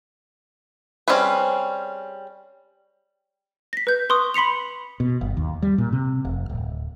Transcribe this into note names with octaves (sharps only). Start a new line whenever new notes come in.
G3 C4 C#4 G#4 B4
A#6 B6
B4 G6
B4 C6 C#6 D#6
B5 C6 B6 C#7 F7
B2
G1
D#2
G3
A#2
C3
F1
D1